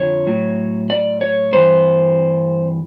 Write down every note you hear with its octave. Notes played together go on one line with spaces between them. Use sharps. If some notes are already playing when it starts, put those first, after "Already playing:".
Already playing: F2 D3 F3 C#5
A2 F#3
D5
C#5
G2 E3 C5